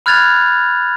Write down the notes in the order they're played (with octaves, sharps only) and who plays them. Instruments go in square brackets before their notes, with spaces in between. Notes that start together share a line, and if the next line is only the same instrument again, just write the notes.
[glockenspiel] B5 F6 F#6 G#6 A6 F7